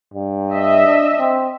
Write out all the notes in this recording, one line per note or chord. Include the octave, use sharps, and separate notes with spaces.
G2
D#5 E5
D4
C4